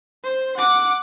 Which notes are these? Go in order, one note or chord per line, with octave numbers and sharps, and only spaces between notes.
C5
F#5 D6